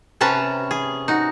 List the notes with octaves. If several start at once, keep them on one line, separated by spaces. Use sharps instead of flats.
C3 C#4 B4 A5 A#5
G#4
D#4 F#4